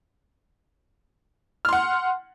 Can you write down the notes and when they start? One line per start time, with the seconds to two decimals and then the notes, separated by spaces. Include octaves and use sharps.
1.65 F6
1.69 C6
1.73 F#5